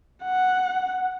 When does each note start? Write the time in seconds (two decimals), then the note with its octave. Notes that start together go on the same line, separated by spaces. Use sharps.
0.23 F#5